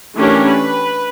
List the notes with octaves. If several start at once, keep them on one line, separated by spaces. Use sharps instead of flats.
E3 A3 C#4 D4 G4 A#4
B4